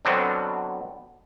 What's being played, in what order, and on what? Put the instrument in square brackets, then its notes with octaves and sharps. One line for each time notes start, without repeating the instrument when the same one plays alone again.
[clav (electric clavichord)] B2 D3 F#3 B3 C4 D4